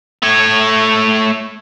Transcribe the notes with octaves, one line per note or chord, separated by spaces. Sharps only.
A3 C#5